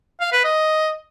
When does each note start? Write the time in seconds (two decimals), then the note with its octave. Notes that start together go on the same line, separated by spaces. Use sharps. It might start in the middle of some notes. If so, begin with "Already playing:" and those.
0.20 F5
0.32 B4
0.44 D#5